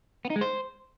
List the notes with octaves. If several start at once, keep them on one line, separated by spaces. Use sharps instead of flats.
B3
D#4
G#3
C5